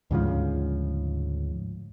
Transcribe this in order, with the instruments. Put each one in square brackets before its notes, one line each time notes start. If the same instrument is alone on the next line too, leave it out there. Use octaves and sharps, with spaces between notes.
[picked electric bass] D2 G#2 C#3 F3